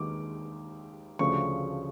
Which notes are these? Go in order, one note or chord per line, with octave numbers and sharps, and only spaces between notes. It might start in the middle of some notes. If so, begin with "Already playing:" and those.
Already playing: D#2 D#3 G#3 D6
D2 C#3 F3 A3 D4 C#6